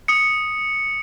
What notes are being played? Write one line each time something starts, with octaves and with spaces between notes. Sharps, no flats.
D#6 C#7